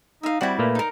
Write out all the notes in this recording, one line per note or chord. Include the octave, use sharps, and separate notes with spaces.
D#4 E5 F5
G3 C4 E4 F#4 D5 F#5
A#2 A3 A#3 B4
D#4 A#4